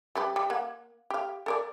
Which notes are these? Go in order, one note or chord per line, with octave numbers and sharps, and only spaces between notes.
G3 G4 B4
G3
A#3 F#5
G4 F5
A4 A#4 D5